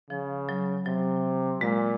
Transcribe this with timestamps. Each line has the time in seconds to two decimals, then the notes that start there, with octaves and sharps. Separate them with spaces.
0.10 C#3 F3
0.49 F#3
0.86 C3 F#3
1.61 A#2 G#3